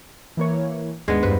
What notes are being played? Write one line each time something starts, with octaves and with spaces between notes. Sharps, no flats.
E3 A#3 C#5
D#2 G#2 G#3 B3 D4
E2 G2 B4 C5